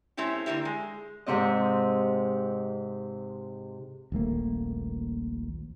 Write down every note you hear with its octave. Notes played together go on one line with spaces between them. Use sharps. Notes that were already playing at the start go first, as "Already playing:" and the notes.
A3 C4 C#4 E4 G4
D3 A#3 D4 E4 G4
G#3
G#2 C3 C4 D#5
D#1 A#1 A3 A#3